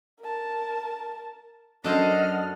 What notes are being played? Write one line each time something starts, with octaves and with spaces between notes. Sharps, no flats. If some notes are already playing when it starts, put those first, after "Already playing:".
A#4 A5
F#2 D4 A4 C5 D#5 F#5 F6